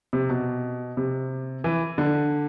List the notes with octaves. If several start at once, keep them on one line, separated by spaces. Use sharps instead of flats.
C3
B2
C3
E3
D3